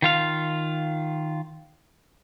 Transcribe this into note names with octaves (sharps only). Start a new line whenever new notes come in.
D#3 F4 F5